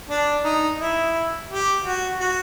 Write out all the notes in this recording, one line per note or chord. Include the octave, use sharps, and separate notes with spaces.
D4
D#4
E4
G4
F#4
F#4